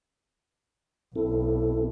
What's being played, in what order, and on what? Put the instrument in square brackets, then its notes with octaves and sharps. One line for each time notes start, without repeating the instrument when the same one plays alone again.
[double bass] B1 [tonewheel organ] C4 E4 A4